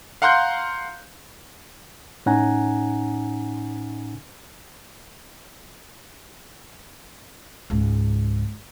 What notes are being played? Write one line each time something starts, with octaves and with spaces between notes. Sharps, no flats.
F5 F#5 A#5 C6 F#6 G6
A2 C#4 D#4 F#5 G#5 A#5
C#2 G#2